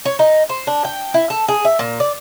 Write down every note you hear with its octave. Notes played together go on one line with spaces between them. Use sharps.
C#5
D#4
C5
D4
G5
E4
A4
G#4
E5
A#2
D5